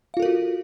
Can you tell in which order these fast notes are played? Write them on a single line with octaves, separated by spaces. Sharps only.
F5 F4 A4 A#4 F#4